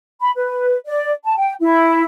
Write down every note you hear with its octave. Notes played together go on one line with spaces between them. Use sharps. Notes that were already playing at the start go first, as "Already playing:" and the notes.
B5
B4
D5
A5
G5
E4